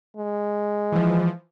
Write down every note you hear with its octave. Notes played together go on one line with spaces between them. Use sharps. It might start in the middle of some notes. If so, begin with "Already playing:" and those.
G#3
E3 F3